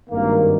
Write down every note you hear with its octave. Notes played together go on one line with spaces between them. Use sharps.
G#1 G2 D#3 A#3